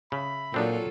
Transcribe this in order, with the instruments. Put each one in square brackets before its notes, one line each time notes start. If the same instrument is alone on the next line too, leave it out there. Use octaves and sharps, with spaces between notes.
[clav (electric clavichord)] C#3 [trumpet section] E5 B5
[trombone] A#2 [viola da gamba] F#3 F4 A4 [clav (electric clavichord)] C4 D4 D#4